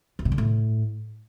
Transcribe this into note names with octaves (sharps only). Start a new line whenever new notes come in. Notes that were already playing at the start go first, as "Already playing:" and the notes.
E2
B2
D3
A2